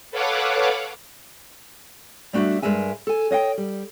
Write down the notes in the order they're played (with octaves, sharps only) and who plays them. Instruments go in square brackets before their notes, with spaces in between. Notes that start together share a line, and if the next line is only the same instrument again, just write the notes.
[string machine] A4 B4 C#5 F5 F#5 D6
[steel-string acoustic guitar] G3 A3 D4 F#4 E5
G2 G#3 A#4 E5 G#5
A4 G#5
C#5 D#5 F5 G5
G3